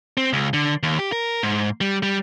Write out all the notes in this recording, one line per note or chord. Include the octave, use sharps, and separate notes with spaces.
C4
C#2
D3
D#2
G4
A#4
G#2
G3
G3